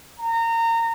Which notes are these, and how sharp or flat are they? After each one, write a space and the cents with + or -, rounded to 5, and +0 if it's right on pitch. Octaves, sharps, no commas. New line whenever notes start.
A#5 -25